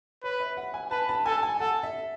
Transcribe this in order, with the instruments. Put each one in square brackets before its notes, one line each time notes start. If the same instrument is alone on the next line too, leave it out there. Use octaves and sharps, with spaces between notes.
[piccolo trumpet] B4 [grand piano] C#5
[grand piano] E5
F#5
G#5
[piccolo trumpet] B4 [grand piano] A5
[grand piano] A5
[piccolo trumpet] A4 [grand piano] G#5
[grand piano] G#5
[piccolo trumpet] A4 [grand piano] F#5
[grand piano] E5